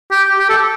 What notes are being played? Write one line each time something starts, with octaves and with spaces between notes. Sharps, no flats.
G4
G4
A4